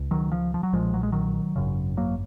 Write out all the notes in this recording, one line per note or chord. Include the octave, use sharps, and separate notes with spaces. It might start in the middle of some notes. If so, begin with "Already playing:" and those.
Already playing: C#2
D#3 F#3
F3
F3
F#3
B1 A#2 F3 G#3
F#3
G#3
D#3 F#3
G#1 F#2 C#3
F#3 A#3